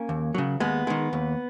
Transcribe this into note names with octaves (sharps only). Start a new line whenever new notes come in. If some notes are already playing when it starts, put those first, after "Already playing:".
Already playing: A#3 C#4
D#2
C#3 F#3
D#2 G#3 B3
D#3 G#3
D#2